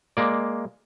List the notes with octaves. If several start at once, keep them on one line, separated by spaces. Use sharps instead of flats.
G#3 A#3 D5